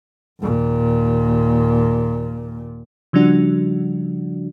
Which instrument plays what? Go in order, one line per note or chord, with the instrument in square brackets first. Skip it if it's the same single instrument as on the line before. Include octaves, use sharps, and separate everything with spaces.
[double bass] D#2 A#2
[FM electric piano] C#3 F3 G3 D4 F#4